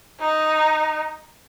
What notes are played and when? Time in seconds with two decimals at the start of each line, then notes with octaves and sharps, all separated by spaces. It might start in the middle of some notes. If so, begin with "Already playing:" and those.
0.20 D#4